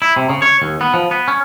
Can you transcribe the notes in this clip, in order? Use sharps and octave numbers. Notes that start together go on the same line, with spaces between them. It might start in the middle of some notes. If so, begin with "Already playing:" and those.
E4
C3
C#3
C#5
D#2
B3
F3
B3
C#4